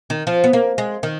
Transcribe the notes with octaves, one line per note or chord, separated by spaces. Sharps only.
D#3
F3
B3
A#3
G#3
D#3